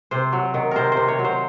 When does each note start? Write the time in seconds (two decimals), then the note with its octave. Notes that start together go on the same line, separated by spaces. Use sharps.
0.11 C3 C5
0.32 F#3
0.54 D#3
0.71 C3 A#4 C5
0.92 C5
0.97 C3
1.08 C#5
1.19 F#3
1.24 C5